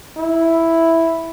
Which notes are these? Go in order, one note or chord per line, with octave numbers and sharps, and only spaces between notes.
E4